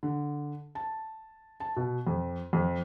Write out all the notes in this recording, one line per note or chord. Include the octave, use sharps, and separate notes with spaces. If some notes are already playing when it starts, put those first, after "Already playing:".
D3
A5
A5
B2
F2
F2